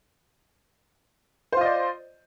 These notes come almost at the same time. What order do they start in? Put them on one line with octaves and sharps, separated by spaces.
C5 F4 D#5 D5